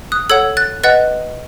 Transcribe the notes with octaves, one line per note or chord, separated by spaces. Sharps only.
D#6 F#6
A4 C#5 F#5 E6 G#6
F#6 A6
B4 D#5 F#5 F#6 A6